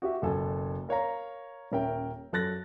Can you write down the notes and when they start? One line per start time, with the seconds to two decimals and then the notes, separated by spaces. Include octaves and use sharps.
0.02 F#4 G4 E5
0.22 F#1 B2 A4 G#5
0.89 A#4 C#5 F5 A#5
1.72 D#1 C#4 A#4 E5 G5
2.33 F#2 A4 F#6 A6 A#6